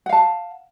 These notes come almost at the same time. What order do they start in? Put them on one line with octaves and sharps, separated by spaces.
F#5 F5 A5